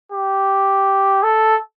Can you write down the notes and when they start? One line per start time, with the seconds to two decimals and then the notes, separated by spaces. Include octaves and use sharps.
0.12 G4
1.23 A4